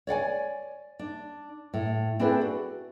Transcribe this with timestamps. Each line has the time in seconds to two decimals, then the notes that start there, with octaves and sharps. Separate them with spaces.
0.07 C#5 D5 F#5 G#5
0.99 D4
1.74 A2
2.19 C4 D4 E4 G#4 A4 B4
2.41 F#4